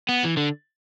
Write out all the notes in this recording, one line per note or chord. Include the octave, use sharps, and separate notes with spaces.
B3
E3
D3